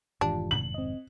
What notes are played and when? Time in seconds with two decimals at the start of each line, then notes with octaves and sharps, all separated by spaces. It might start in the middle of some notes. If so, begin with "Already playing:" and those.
0.21 F1 G#2 D#3 E3 D4 F4 G4
0.51 A2 C3 F#7
0.74 C4 D#5